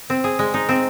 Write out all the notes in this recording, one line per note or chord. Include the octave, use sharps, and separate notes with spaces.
C4
G#4
G#3
D#4
C4